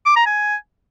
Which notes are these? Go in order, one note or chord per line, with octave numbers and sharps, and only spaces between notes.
D6
A#5
G#5